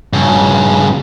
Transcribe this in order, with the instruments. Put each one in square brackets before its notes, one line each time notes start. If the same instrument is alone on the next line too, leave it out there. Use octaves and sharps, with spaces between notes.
[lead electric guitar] G2 C#3